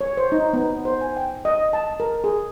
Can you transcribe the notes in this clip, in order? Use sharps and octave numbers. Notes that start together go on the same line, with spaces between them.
C#5
C5
D#4
B3
C5
G#5
G5
D#5
A5
A#4
G#4